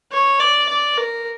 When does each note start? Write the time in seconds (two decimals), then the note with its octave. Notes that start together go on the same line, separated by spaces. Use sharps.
0.12 C#5
0.40 D5
0.69 D5
0.97 A#4